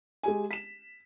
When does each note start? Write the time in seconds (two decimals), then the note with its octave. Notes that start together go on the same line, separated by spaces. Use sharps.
0.23 G#3 G4 G#5
0.51 B6 E7